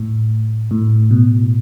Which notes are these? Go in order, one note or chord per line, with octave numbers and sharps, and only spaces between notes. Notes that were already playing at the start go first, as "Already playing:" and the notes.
Already playing: A2
A2
B2